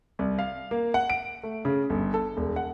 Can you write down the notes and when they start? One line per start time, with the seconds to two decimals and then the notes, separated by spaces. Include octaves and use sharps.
0.19 C2
0.39 F5
0.71 A#3
0.94 F#5
1.10 D7
1.43 A3
1.65 C#3
1.90 G1
2.14 A4
2.37 E1
2.56 F#5